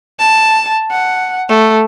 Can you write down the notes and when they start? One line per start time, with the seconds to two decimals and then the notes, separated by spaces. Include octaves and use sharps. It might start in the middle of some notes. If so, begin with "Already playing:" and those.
0.19 A5
0.91 F#5
1.49 A3